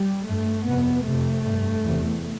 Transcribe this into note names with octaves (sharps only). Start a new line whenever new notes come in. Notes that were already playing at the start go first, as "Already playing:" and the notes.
Already playing: G3
G2 A3
F2 C3 B3
F2 C3 A3
G2
E2 C3